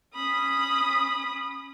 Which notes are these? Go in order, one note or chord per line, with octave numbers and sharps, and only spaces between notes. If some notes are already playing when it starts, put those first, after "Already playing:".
C#4 B5 D#6